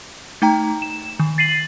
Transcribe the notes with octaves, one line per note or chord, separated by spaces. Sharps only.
A3 D#4 G5 A#5
E7
D#3
A6 C7 D#7 F#7